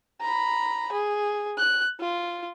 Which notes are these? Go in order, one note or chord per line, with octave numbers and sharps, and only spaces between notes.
A#5 B5
G#4
F#6
F4